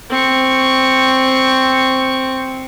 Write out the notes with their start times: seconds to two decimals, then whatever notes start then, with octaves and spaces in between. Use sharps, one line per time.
0.10 C4 C#6